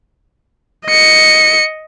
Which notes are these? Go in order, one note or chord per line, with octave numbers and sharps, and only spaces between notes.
D#5 C#7